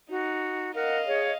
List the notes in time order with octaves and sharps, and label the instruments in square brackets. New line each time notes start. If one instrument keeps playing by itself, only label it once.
[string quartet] D#4 [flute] F#4
[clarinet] A#4 [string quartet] D#5 F5 [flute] F#5
[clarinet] G#4 [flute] C#5